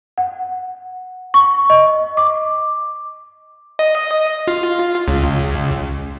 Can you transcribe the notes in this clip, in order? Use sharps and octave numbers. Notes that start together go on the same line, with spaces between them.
F#5
C#6
D#5
D6
D#5
F4
C#2